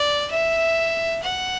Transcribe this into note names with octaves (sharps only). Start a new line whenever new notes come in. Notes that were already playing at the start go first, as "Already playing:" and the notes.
Already playing: D5
E5
F#5